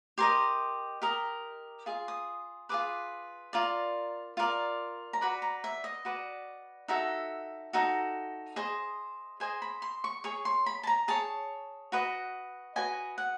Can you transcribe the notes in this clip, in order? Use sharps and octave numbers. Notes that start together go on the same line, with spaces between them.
G4 A#4 D#5 C6
G4 A#4 D#5
F4 G#4
D#6
F4 G#4 B4 D6
F4 A#4 D5
F4 A#4 D5
A#5
F#4 B4 D5 B5
A#5
E5
D#5
F#4 B4 D5
D#4 F#4 A4 E5
D#4 F#4 A4
G#4 C5 D#5
G#4 C5 D#5 G#5
B5
C6
C#6
G#4 C#5 C#6
C6
B5
A5
A#5
G#4 C#5 A5
F#4 B4 D#5
F#4 B4 D#5 G#5
F#5